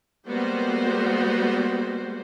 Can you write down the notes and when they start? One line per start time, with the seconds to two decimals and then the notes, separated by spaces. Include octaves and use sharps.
0.29 G3 G#3 A#3 B3 F#4 C5